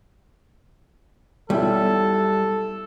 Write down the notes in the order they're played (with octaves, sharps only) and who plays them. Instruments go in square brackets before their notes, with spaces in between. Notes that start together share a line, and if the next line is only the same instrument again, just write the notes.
[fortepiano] B1 E4 [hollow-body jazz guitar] G3 [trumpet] A4